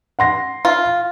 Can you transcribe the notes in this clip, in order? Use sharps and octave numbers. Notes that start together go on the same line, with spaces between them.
F#5 C6 A#6
F4